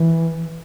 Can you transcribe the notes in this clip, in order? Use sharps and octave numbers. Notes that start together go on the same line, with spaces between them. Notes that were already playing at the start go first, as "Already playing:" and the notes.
Already playing: E3